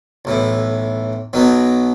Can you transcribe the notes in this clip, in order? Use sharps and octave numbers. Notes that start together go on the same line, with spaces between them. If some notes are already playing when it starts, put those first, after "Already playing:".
B1 A2 E3
B1 B2 F#3 B3